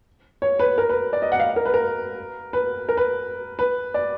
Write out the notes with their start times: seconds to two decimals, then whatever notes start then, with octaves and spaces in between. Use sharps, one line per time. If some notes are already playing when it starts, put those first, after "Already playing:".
0.42 C#5
0.59 B4
0.78 A#4
0.89 B4
1.13 D5
1.22 D#5
1.32 F#5
1.40 F5
1.56 A#4
1.65 B4
1.74 A#4
2.53 B4
2.89 A#4
2.97 B4
3.59 B4
3.94 D5